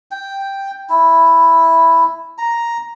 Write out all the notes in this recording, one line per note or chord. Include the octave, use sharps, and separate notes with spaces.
G5
E4
A#5